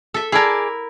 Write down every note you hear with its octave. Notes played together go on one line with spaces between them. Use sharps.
A4 E5
E4 G#4 A#4 D5 A5